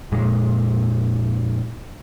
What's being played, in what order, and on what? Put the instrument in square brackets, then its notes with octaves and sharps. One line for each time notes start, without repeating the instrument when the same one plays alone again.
[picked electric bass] F2 A#2 G#3